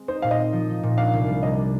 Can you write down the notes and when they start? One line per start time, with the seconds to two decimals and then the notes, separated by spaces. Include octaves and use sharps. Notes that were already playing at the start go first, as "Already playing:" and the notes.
Already playing: G#3 C4
0.08 D#4 C5
0.22 A#2 F5
0.31 D#5
0.38 C4
0.53 F3
0.69 D#4
0.83 A#2
0.98 D4 F5
1.13 C2
1.28 G3
1.43 C3 D#5
1.58 D4